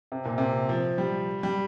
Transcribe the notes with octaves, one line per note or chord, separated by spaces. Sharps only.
C3
A#2
C3
F3
G3
G3